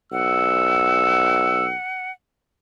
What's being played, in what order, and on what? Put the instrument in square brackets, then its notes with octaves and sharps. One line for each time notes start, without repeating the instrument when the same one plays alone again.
[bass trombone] B1 [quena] F#5 [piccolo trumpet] E6